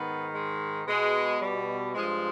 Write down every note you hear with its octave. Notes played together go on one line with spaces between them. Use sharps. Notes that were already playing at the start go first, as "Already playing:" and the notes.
Already playing: G#2 D#3 B3
G#3
B2 G#3
G3
G2 F3 G#3